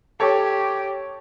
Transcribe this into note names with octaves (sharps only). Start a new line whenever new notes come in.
G4 A4 C#5